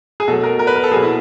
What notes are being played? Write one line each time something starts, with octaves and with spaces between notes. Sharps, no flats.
G#4
B2 F#3 A3 A4
A#4
A#4
B4
A#4
A4
B2 F#3 A#3 G#4
E4